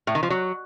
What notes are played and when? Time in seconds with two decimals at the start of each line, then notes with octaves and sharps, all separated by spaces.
0.07 A2
0.15 D#3
0.23 F3
0.30 F#3